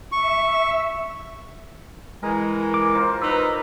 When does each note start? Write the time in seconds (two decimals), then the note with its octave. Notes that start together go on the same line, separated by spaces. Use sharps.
0.12 E5 C#6
2.23 E3 G#3 A#4
2.74 D6
2.95 F4 A#4 C5
3.22 D#4 B4 E6